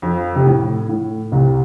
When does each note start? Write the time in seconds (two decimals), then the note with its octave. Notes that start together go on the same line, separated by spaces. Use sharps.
0.02 F2 F3
0.36 C3
0.46 A2
0.89 A2
1.32 C2 C3